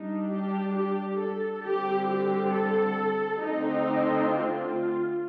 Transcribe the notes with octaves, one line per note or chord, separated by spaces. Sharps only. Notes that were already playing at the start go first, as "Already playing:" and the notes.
Already playing: G3 D4 D#4
G4
G4
A4
D3 G3 C4 G4
G4
A4
D3 A3 C4 D#4
F4